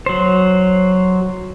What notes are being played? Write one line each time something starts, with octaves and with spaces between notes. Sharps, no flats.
F#3 C5